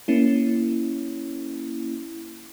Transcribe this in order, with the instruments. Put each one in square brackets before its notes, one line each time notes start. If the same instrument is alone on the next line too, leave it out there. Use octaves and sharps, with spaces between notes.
[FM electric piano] A#3 C#4 E4